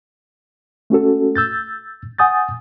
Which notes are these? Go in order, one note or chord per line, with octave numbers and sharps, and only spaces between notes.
A3 C#4 F#4 A4
E6 G6 A6
F#5 G#5 D#6 G6 A6